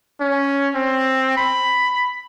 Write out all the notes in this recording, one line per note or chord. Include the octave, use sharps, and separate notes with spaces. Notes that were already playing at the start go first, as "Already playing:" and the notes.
C#4
C4
B5